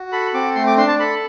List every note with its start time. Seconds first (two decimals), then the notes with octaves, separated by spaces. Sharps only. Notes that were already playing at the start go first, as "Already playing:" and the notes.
Already playing: F#4
0.12 A4 B5
0.34 C4 D6
0.55 A3 C6
0.67 D6
0.77 D4 C6
0.88 A5
0.99 A4 B5